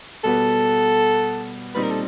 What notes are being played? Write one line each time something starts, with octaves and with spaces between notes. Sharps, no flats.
B2 G3 B3 A4
A#2 G3 C4 D#4 B4
A#4
A4